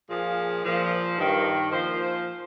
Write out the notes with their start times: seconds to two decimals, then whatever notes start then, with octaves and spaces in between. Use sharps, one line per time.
0.09 A#2 F3 G#4
0.63 A#2 F3
1.18 G2 D#3
1.72 A#2 F3 C5